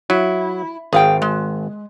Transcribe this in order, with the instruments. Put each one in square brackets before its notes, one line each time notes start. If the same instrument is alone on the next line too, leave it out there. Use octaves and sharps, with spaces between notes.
[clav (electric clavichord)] F#3 [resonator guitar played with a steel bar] E4
[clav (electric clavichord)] G#1 [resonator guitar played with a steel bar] G#4 F5 G5
[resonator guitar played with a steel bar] G#3